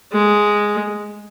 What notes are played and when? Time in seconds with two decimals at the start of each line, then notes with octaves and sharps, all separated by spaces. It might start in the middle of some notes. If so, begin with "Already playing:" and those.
0.12 G#3